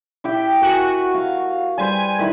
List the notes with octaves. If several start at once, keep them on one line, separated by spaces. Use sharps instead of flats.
E4 G4 G5
F#4 A#4 G#5
F5
G3 B4 C5 G#5
D#3 E4 B5